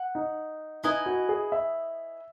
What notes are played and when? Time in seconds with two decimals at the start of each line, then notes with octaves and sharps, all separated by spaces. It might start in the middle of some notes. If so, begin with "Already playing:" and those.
Already playing: F#5
0.15 D#4
0.83 D#4 E4 B4 D#5 G#5
1.06 F#4
1.29 G#4
1.52 E5